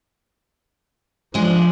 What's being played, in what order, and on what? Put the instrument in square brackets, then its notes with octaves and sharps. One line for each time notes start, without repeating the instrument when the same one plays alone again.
[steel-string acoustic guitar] D2 G#3 D4 [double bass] F3